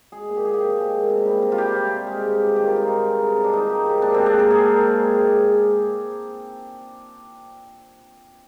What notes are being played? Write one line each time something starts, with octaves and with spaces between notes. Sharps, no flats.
G#3 G#4
A#2
G4
A#2 G#4
G4
F3
G#3
A#2
C3
G3
C3
F4
G3 G4
C3
G3
G#3
G2
G2
D#3 G4
F4
G#3 D#4
G2 F4
G#3
C3
C3
D4
D#3 D#4
G#3 G4
C3
A#2 D4
G#3 C4
D4
A#2 A#4
G#3 G#4
A#2
G#3
G#3
G#2
G#2